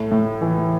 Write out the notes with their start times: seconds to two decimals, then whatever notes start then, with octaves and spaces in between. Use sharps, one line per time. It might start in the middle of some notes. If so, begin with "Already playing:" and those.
Already playing: A2 A3
0.12 A2
0.42 E3